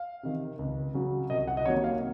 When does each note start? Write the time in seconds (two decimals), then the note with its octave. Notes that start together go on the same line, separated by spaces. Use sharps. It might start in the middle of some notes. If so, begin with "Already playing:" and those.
Already playing: F5
0.23 C3 D#3
0.59 C#2
0.94 C#3 F#3
1.30 C2 D#5
1.48 F#5
1.57 D#5
1.65 C3 D#3 F#3 A#3 C#5
1.84 F5